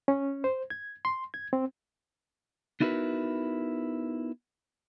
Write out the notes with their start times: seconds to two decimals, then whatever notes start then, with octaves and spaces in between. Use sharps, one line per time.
0.08 C#4
0.44 C5
0.70 G#6
1.05 C6
1.34 G#6
1.53 C4
2.80 B3 D#4 E4 F#4 A#4 B4